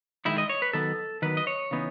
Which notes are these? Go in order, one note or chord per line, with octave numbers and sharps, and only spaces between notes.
D#3 G#3 D#4 E4
D#5
C#5
B4
D#3 F#3 B3 A4
D#3 F#3 B3 B4
D#5
C#5
C#3 E3 B3 D#4